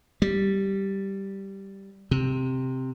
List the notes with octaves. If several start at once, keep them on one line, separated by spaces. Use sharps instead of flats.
G3
C3